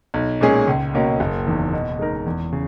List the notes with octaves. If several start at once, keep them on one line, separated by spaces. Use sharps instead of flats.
B1
A#2 G#3 C#4 G#4
C#2
B2 A#3 C#4 F#4
F#1
E2 D#3
B2
G#3 D#4 A#4
E2
C#3